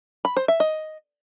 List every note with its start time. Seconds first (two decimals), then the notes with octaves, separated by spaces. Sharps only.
0.25 B5
0.37 C5
0.48 E5
0.60 D#5